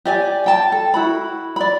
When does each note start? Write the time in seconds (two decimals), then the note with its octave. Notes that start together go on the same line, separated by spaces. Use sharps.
0.05 G4 D5 G#5
0.46 G5 A5
0.72 A4
0.94 E4 F#4 B5
1.56 D5 B5